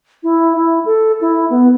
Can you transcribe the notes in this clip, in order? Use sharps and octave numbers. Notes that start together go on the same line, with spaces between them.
E4
E4
A4
E4
B3